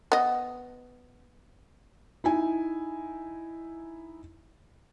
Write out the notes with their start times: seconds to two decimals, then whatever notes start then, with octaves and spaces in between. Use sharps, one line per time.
0.12 B3 D#5
2.24 D#4 E4 G#5